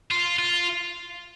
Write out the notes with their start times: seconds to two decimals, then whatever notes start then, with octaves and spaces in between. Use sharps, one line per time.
0.11 F4
0.39 F4